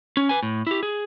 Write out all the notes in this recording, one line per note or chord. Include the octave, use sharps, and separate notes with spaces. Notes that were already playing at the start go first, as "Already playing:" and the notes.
C#4
B4 G#5
A2
E4 G4
G#4